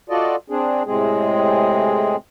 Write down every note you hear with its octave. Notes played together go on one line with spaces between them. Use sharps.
F4 F#4 A4 D5 D#5
C4 D4 G#4
A2 C3 G#3 C4 G#4